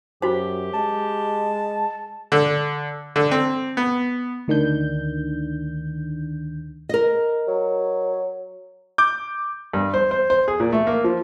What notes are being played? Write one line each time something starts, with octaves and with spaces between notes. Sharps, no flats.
F#2 F#4 G4 C5
G#3 A5
D3
D3
C4
B3
D2 D#3 D4 G6
A#4 D#5
F#3
D6 G6
G2
C5
C5
C5
G#4
A#2
A3
A#3
F3